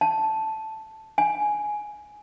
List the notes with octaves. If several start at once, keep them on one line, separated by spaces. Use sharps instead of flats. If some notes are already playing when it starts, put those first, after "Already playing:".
A5
G#5